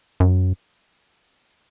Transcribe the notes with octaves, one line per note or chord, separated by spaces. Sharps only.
F#2